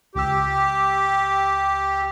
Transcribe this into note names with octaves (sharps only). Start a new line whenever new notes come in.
C#2 G4 E6